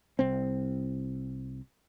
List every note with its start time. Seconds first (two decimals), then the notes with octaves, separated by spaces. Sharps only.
0.19 C2 C4